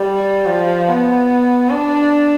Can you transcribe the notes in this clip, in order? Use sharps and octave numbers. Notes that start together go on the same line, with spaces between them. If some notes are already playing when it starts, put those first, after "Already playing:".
Already playing: G3
F3
B3
D4